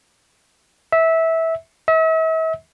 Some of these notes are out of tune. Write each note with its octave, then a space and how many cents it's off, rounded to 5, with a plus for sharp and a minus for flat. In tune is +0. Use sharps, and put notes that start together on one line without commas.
E5 -15
E5 -40